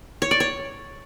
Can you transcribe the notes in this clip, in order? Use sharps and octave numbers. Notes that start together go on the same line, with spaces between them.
C#5
D5
C#5